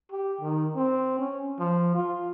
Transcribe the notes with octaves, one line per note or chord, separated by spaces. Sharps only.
G4
D#3
C4
C#4
F3
F4